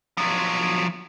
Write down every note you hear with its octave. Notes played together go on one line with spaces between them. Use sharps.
F3 F#3